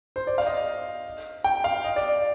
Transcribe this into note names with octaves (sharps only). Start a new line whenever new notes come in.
C5
D5
F5
D#5
G5
F5
D#5
D5